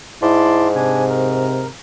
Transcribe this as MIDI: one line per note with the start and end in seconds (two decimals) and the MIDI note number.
0.22 1.70 44
0.22 0.70 64
0.22 0.68 74
0.22 0.68 81
0.22 0.68 84
0.75 1.68 48
0.75 1.04 62
0.75 1.04 80
1.09 1.67 70